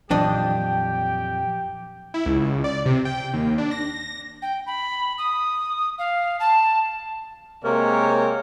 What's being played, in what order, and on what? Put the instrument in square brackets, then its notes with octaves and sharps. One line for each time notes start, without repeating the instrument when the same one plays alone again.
[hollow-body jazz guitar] F2 D4 D#5 [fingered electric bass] A#2 E3 F#3 [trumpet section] G4 G5
[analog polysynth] E4
C#2
D5
C3
G5
D#2
D4
A#6
[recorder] G5
B5
D#6
F5
A5
[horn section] C3 G#3 A#3 A#4 C#5